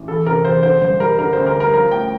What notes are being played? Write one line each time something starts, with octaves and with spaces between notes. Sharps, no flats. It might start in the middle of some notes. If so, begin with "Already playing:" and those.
Already playing: A1
E3 A4
C3 A#4
E2 C5
D3 C5
G2 C5
G3 A#4
D3 A#4
D2 C5
A#4
G3
A#4
F3 A#4
A2 G5